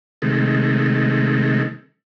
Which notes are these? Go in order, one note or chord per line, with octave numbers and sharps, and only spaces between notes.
C3 D#3 G#3 A3